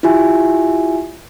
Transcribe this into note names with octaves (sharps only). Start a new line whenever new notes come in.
E4 F4 G4 E5 G#5